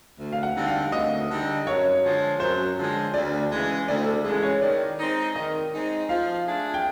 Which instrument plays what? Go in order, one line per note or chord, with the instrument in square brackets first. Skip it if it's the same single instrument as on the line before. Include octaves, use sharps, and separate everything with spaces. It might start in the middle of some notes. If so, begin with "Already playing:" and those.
[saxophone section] D2
[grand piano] F5
F#5
[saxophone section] D3 G3 C4 D#4
[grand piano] F5
[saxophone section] D2 [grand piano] D#5
[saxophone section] D3 G3 C4 D#4
[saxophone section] F#2 [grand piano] C#5
[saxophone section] D3 F3 G#3
[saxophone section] F#2 [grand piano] C5
[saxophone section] D3 F3 G#3
[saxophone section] D2 [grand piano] D5
[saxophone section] C#3 E3 G#3
[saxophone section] D2 [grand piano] D5
[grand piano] A4
[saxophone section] C#3 E3 G#3 [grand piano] G#4
[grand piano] C#5
[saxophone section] D#3 [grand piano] D5
[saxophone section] G#3 C4 D#4
[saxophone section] D#3 [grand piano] D#5
[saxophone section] G#3 C4 D#4
[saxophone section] F3 [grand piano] F5
[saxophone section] A3 D4 F4 G#4
[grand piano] G5